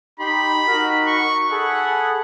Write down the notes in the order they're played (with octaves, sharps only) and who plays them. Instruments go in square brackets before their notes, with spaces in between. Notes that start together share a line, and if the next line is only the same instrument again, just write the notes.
[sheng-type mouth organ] D#4 G4 C6 [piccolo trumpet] B5
[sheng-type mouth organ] D#4 F#4 A#4
[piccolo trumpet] C#6
[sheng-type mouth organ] G#4 A4 B5 [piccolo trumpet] F#5